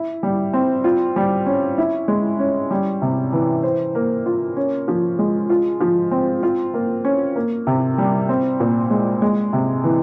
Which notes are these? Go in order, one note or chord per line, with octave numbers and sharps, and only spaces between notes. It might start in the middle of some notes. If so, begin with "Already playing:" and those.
Already playing: E4
G3
C4
F4
G3
C#4
E4
G#3
C#4
G3
C3
E3
C5
A#3
F4
C#4
F3
G#3
F4
F3
C4
F4
A#3
C#4
A#3
C3
G3
C4
A#2
G#3
G#3
C3
E3